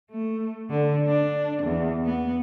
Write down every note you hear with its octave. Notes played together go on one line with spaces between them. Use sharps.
A3
D3
D4
E2
B3